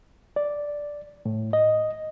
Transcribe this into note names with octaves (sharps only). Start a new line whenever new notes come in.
D5
A2
D#5